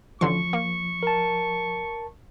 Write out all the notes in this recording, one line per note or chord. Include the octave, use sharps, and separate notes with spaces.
A1 D3 F3 C6 C#6
A#3
A#4 A5